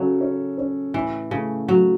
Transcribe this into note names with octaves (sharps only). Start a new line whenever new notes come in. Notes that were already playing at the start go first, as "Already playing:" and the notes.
Already playing: C#3 F#3 C#4 A4
C#4
C#4
A2 E3
C#3 A3
F#3 A3